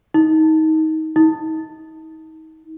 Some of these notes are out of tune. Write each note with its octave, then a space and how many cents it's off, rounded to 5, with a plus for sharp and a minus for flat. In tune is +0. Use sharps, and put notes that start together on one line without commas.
D#4 +25
D#4 +35